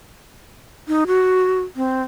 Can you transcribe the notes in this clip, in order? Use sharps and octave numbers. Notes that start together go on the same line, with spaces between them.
D#4
F#4
C4